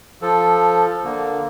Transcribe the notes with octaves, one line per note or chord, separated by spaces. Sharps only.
F3 A4
D3 A#3